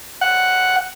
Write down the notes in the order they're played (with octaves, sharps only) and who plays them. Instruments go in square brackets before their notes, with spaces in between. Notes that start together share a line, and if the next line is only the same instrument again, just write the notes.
[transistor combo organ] F#5